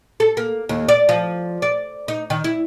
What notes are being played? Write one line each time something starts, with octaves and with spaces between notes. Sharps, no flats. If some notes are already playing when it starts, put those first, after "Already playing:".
A4
A#3
D#2
D5
F3
D5
D#4
D#3
E4